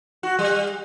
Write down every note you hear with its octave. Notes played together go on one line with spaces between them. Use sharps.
F#4
G3